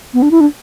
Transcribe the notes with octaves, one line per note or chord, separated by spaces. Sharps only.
B3
D4
E4
D4